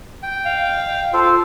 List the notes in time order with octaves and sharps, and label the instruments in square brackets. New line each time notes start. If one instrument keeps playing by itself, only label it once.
[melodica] G5
[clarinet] F5
[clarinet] F4 [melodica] A4 C5